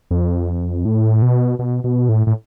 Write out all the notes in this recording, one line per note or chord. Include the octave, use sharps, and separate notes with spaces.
F2
A2
B2
B2
B2
A2
A2